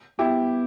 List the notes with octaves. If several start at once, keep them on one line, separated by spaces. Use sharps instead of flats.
B3 E4 G4